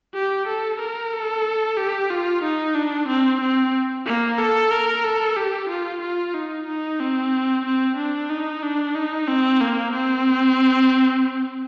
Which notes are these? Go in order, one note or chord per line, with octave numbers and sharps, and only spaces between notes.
G4
A4
A#4
A4
G4
F4
D#4
D4
C4
C4
A#3
A4
A#4
A4
G4
F4
F4
D#4
D#4
C4
C4
D4
D#4
D4
D#4
C4
A#3
C4